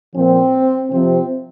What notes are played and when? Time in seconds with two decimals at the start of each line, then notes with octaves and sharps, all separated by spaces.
0.14 A#2 F3 C4
0.91 C3 F3 C4